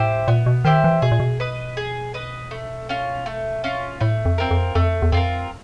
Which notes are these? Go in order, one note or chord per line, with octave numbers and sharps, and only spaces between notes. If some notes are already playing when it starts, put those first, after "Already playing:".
Already playing: A2 E4 G4 C5
A#2 B3
B2
D#3 E4 G4 C5
E3
B2 G#4
A#2
B2
B4 D#5
G#4
B4 D#5
A3
C#4 F4
A3
C#4 F4
A2 A3
F2
C4 F4 A#4
F2
F2 A3
E2
F2 C4 F4 A#4